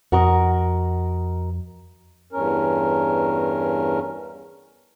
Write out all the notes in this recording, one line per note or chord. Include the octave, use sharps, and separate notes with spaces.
F2 F#4 A#4 D#5
E2 G2 C#4 A#4